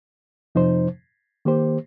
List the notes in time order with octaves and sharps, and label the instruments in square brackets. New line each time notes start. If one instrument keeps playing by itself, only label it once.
[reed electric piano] F2 C3 F3 D#4 C5
D#3 A#3 G4 C5